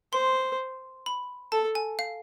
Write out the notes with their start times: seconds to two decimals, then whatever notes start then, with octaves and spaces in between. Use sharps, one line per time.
0.13 C5 C6
1.06 B5
1.52 A4 A5
1.75 G#5
1.99 F5